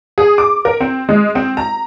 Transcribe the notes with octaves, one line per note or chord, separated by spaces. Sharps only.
G#4
D6
A#4
C4
G#3
C4
A#5